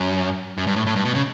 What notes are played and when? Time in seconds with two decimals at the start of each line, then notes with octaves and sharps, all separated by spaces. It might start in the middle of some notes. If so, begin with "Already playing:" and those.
Already playing: F#2
0.58 F#2
0.67 G2
0.76 A2
0.86 A2
0.96 G2
1.05 B2
1.15 C#3